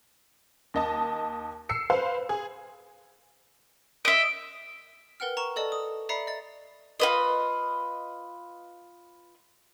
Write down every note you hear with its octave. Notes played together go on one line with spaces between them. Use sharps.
D#2 D#5 A5
E6 C7 C#7
B4 C5 F5
G#4
D#5 E5 D7
A#4 B4 F#5 G5 F6
A#5 C#6 E7
A4 D5 D#5 A5
D#6
D5 E5 A#5 B5 C7 C#7
D#5 A6
F4 B4 D#5